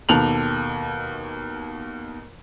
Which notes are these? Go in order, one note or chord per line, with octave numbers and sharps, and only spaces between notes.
D#2 B2 A4 F7 F#7